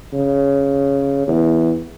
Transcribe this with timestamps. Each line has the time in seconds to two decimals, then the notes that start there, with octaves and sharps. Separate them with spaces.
0.13 C#3
1.28 E2